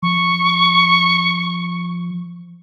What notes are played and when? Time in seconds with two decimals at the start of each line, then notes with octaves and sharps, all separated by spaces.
0.03 F3 C#6